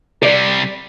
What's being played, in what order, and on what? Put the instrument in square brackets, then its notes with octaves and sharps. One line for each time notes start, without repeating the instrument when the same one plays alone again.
[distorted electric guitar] C3 G3 [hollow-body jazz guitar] D5